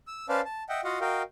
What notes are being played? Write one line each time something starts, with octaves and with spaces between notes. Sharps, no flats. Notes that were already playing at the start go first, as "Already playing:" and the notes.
E6
C#4 B4 C5 D5 F5 A5
A5
D#5 E5 F#5 G5
F4 F#4 D#5 F5 F#5
F#4 A#4 D#5 F5 G5